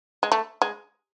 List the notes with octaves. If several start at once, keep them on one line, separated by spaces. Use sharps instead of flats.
G#3
A3
G#3